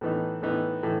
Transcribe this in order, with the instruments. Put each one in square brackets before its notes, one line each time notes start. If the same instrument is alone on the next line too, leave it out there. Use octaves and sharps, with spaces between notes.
[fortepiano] A2 E3 B3 D#4
A2 E3 B3 D#4
A2 E3